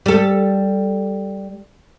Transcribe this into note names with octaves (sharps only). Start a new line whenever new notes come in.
G3 A4